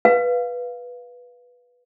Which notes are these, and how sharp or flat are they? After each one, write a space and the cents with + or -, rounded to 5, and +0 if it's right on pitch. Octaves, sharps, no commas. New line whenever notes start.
B4 -5 F5 +0